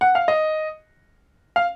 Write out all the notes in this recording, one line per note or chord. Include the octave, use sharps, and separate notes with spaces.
F#5
F5
D#5
F5